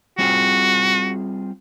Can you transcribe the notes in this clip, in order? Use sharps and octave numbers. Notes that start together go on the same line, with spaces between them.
G3 C4 F4 F#4 G#4